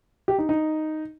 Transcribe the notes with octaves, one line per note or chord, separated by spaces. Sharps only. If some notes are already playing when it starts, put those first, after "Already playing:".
G4
D#4
D#4